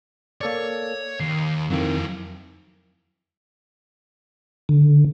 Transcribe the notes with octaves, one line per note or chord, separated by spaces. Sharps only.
A#3 A4 C#5 D5
D#2 C7
F2 D#3 F#3 E4
D3